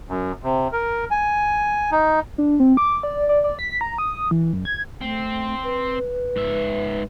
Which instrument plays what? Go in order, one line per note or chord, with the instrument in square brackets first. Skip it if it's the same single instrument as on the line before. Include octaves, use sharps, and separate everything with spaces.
[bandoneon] F#2
C3
A#4
G#5
D#4
[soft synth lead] D4
C4
D6
D5
D5
D5
B6
A#5
D#6
E3
F#2
G#6
[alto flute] A3 [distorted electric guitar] C4
[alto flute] B4
[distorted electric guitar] G#2 E5